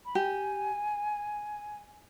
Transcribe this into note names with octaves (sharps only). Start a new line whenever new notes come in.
B5
G4 G#5